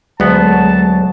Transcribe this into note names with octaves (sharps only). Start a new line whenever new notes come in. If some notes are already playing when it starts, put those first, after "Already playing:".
D2 F#3 G#3 B3 A5